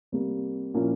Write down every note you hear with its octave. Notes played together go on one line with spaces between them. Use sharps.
C3 G3 A#3
A#2 F3 A#3 C#4 E4